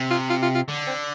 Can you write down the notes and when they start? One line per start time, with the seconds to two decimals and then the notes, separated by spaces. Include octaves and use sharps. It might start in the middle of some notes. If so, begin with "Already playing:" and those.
Already playing: C3
0.11 F4
0.30 F4
0.43 F4
0.55 F4
0.68 D3
0.87 C4